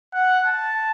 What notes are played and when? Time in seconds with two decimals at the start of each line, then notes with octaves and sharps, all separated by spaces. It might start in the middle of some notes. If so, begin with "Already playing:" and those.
0.14 F#5
0.46 A5